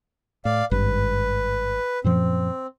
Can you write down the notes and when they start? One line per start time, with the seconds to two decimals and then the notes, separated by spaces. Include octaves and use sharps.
0.45 A2 D5 F5
0.71 G#1 G2 B4
2.04 F#2 A#2 F3 C4